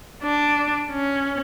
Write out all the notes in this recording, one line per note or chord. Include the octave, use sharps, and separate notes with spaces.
D4
C#4